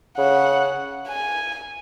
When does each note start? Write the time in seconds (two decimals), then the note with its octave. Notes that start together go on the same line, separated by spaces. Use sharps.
0.17 C#3 F#5
1.08 G#5